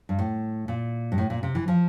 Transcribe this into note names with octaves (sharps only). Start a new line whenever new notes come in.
G2
A2
A#2
G2
A2
A#2
C3
E3
F3